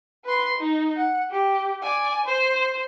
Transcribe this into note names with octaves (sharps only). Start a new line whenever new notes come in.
B4 C6
D#4
F#5
G4
D5 G#5
C5